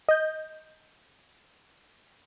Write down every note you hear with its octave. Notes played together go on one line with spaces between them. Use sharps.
D#5 G6